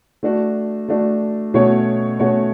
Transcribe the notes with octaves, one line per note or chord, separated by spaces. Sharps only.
A3 D4 F#4
A3 D4 F#4
B2 A3 C#4 F#4 C#5
B2 A3 C#4 F#4 C#5